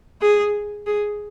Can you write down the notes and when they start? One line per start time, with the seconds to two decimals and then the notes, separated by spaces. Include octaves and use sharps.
0.22 G#4
0.87 G#4